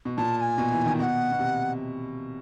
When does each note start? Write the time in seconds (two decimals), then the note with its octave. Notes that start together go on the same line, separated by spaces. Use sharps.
0.05 B2
0.17 A#2 A5
0.37 A5
0.41 G#5
0.58 B2
0.72 E3
0.86 D#3
0.99 B2 F#5 G5
1.32 B2
1.39 C3